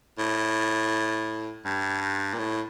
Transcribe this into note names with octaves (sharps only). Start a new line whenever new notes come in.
A2
G2
A#2
A2